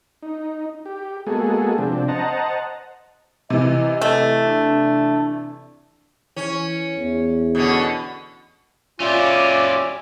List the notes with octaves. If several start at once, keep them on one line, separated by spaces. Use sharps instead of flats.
D#4
G4
G#3 A#3 B3 F#4 G#4 A4
C3 F3 C4 D4
C5 D#5 F#5 A5 A#5
C3 E3 D#5
A3
D4
E3 C#4
E2
B2 D3 C#4
C#4 F4 G4 D5 E5 G#5